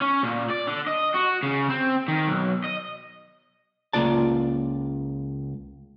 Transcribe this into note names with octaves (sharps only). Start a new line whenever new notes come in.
C#4
A#2
D5
D3
D#5
F#4
C#3
C4
D#3
B1
D#5
C#2 A#3 F4 D5 A5